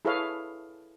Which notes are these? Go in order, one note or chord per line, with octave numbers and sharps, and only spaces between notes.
E4 G#4 A4 B4 C#5 F5